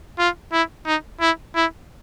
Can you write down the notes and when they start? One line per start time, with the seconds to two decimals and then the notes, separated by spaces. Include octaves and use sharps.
0.19 F4
0.52 E4
0.86 D#4
1.21 E4
1.55 E4